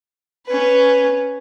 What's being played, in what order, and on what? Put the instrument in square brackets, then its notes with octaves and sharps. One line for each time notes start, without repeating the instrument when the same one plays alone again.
[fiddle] C#4 B4